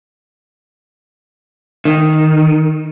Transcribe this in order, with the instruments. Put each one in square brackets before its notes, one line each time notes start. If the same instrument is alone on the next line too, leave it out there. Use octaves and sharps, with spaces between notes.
[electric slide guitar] D#3